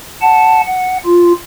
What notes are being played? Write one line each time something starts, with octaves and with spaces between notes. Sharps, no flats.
F#5 A5
F#5
F4